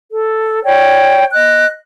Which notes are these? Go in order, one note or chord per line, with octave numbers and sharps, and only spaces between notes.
A4
C#5 D5 G5
D#5 F#6